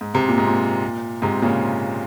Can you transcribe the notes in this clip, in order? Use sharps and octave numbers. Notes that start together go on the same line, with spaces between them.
G#2
G#2 C3
A#2
G#2
A#2
G#2 C3
A#2 C#3